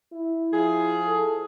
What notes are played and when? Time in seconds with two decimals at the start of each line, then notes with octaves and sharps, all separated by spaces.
0.13 E4
0.53 F3 G#4
1.07 A4